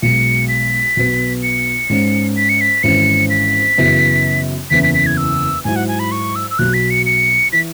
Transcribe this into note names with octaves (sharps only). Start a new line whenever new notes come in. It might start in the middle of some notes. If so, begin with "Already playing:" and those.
B1 B2 G#3 C#7
B6
B1 B2 B3
C#7
G#2 G#3 C#4
B6
C#7
B6
G#1 G#2 E3 C#4 E4 C#7
B6
F#2 C#3 E3 B3 E4
F#1 E2 E3 C#4 E4 B6
B6
B6
G#6
E6
G#2 F#3 E4 G#5
F#5
G#5
B5
C#6
E6
E6
B1 B2 F#3 F#6
B6
C#7
C#7
E3 B6